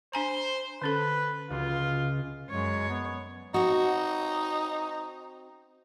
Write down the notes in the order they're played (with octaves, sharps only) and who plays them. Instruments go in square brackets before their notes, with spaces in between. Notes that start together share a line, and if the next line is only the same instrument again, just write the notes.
[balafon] D4 G#5 A#5 [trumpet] C5
[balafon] D3 C#4 A4 [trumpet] B4
[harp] C#2 F#4 [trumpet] F4
[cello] F#2 C#5 [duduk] G#3
[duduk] B3
[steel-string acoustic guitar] C4 F#4 [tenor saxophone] D#4